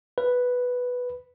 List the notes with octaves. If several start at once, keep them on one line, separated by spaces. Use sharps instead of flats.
B4